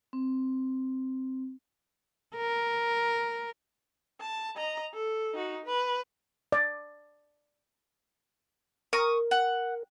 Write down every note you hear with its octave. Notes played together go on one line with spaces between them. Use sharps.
C4
A#4
A5
D#5 A#5
A4
D#4 F#4
B4
D5
A#4 C#6 D#6
F#5